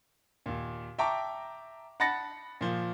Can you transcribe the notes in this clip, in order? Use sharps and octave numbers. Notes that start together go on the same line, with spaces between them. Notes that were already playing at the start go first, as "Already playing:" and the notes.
D#2 A#2
E5 G5 A5 A#5 C#6 D6
F#5 A5 B5 A6 A#6 C#7
A#2 F3